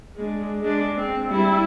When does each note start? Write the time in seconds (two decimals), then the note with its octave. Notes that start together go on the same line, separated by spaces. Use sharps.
0.16 G#3 D4
0.61 G#3 D4
0.96 C4
1.30 G3 E4